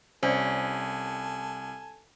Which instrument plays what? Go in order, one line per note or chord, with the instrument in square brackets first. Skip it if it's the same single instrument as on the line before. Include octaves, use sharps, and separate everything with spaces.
[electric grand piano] C2 [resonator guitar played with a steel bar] C#4 [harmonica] A4 G#5 [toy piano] C5 D5